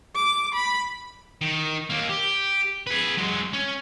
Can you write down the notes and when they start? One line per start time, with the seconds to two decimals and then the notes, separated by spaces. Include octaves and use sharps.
0.15 D6
0.54 B5
1.42 D#3
1.90 D#2 A#3
2.09 G4
2.87 G#4 B4
3.18 F#3 G#3
3.53 C#4